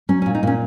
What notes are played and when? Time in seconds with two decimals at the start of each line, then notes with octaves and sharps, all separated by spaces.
0.09 F#3 C#4
0.22 A#2 C#4
0.35 D#4
0.43 A#2 C#4